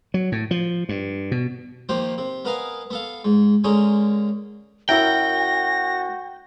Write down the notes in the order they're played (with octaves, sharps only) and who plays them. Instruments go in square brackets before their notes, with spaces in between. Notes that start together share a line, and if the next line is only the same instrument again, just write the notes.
[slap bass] F#3
A2
F3
G2
B2
[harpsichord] D#3 F3 A#3 G4 C5
C3
B3 A#4 B4 D#5 F5 G#5
B3 A4 F5
G#2
D3 G#3 C#4 G#4 A#4
[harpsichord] F#2 E4 A#4 [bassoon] F#4 [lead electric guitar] G5 [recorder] A#6